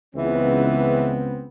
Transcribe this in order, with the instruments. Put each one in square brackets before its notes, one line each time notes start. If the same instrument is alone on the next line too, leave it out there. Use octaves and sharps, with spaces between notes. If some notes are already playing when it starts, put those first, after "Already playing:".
[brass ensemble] C#2 B3 C4 [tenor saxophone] E3